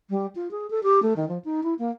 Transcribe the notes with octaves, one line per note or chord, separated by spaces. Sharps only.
G3
F4
G#4
A4
G4
A3
D#3
F3
D#4
E4
A#3